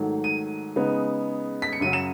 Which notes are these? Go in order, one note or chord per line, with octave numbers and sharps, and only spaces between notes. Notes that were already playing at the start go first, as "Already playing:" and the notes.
Already playing: G#2 D#3 F#3 A3
D#7
C#3 G#3 B3 D#4
B6
C#7
F#2 C#3 F#3 D#7
E7